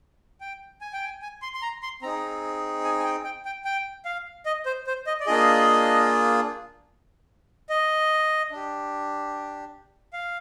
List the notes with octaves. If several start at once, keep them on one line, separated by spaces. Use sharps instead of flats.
G5
G#5
G5
G#5
G#5
C6
C6
A#5
C6
C4 D#4 G#4 A#5
G#5
G#5
G5
G5
G5
G5
F5
D#5
C5
C5
D#5
D5
A#3 D4 F4 G#4 D#5
D#5
D4 G4
F5